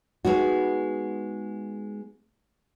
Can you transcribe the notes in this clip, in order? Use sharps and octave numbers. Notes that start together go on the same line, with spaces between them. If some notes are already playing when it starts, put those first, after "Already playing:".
G#3 B3 D#4 F#4